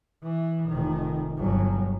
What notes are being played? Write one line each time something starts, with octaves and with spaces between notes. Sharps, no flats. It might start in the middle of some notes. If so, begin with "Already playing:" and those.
E3
F1 D#3
G1 F#3